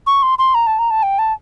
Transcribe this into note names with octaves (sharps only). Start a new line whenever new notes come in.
C#6
C6
C6
A#5
A5
A#5
A5
G5
A5